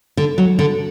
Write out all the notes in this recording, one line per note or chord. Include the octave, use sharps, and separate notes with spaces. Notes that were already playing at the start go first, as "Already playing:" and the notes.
D3
F#3
D3